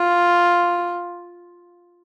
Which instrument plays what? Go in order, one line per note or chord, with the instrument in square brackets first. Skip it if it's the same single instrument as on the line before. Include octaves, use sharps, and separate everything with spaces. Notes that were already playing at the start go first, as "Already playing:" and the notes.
Already playing: [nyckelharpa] F4